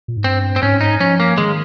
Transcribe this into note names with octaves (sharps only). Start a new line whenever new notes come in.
A#2
G#2
G2 C4
C4
G#2 C#4
D#4
F3 C#4
A#3
D#3 G#3